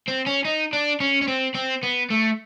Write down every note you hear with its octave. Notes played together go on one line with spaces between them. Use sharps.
C4
C#4
D#4
D4
C#4
C#4
C4
C4
B3
A3